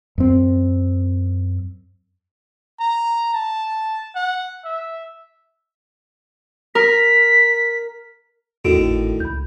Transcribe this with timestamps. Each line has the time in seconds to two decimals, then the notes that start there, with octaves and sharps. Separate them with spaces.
0.18 F#2 C4
2.80 A#5
3.34 A5
4.15 F#5
4.65 E5
6.75 A#4 B6
8.65 E2 A2 D3 D#3 F#4 A4 D7
8.78 G#1
9.20 C#2 B5 G6